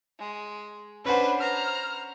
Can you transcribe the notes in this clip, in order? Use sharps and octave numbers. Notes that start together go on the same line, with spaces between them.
G#3
C#4 D4 B4 C5 F#5
C5 A#5 F6